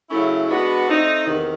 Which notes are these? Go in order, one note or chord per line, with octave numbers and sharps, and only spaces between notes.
C#3 F#3 A3 C#4 E4
G#3 B3 D4 F#4 B4
A3 C4 D#4
E2 C3 D#3